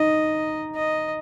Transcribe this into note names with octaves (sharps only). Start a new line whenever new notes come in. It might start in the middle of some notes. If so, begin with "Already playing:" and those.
Already playing: D#4 D#5
D#5